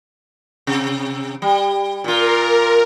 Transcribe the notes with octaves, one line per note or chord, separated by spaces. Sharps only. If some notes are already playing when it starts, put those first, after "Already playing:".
C3
G3
A#2 F4 A#4